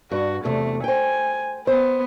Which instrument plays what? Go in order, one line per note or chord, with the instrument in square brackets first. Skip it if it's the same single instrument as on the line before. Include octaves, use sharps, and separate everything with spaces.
[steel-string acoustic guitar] G2 [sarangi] F#4
[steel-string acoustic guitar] E2 C3 [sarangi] A3
[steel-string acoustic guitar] C5 G5 [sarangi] G#5
[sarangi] B3 [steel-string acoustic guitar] C5